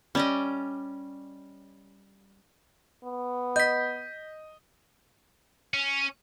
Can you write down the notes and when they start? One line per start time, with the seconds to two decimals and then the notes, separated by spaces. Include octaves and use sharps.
0.15 G3 C#4 D5 D#5
3.04 B3
3.56 D#5 G6 B6
5.74 C#4